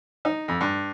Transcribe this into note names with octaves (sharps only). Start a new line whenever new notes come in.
D#4
F2
G2